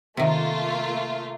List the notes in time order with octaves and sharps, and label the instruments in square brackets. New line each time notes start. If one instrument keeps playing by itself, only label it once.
[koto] C3 D#3 [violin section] A3 A#3 F4